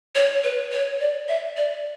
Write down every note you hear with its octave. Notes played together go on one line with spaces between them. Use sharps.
C#5
B4
C#5
D5
E5
D5